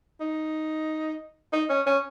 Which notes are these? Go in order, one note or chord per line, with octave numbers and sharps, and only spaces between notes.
D#4
D#4
C#4
C#4